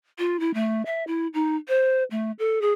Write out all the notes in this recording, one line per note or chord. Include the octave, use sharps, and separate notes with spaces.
F4
E4
A3
E5
E4
D#4
C5
A3
A4
G#4